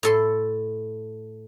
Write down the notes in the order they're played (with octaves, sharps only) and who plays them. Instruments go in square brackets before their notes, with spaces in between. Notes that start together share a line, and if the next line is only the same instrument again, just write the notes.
[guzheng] A2 A4 C6